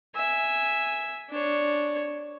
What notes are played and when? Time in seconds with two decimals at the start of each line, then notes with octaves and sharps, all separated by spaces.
0.15 E5 G#5
1.30 D4 C#5